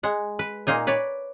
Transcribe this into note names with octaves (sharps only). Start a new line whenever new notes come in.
G#3 F#5
B4
A#2 A#3 D#4 G#5
B4 C#5 D5